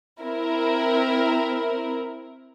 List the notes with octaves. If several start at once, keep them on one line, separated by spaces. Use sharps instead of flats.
C4 E4 A#4